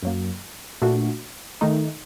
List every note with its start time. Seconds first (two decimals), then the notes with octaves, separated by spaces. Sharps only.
0.03 F#2 F#3 A#3
0.82 A#2 A3 D4 F#4
1.61 D#3 A3 D#4